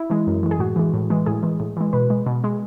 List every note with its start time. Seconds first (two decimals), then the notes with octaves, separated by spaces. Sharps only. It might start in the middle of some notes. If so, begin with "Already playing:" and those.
Already playing: E4
0.10 E3 G#3
0.27 F#2
0.43 E3 G#3
0.51 G#4
0.59 A2 F#4
0.76 E3 G#3
0.94 A2
1.10 E3 G#3
1.26 A2 G#4
1.43 E3 G#3
1.60 A2
1.77 E3 G#3
1.93 B2 B4
2.10 G#3
2.26 B2
2.44 G#3